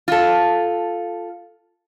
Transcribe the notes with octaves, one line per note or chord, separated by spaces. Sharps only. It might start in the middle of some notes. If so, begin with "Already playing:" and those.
F4 A4